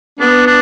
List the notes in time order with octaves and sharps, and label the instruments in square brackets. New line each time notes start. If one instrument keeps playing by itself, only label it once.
[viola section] B3 [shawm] D4
[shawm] D4